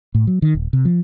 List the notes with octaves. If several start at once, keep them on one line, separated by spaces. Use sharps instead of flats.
A2
F#3
D#3
D#1
C3
F3